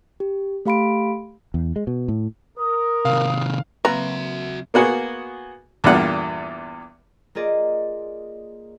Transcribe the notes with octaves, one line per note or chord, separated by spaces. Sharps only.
G4
A3 G4 F5 B5 C6 D7
E2
G#3
B2
A2
A#4 D#6
C3 D#3 F5
C#3 F#3 A#3 C4 F#4 B4 E5 A#5
A#3 B3 F#4 G#4
E2 G2 A#2 F#5
A#3 F4 G#4 D5 D#5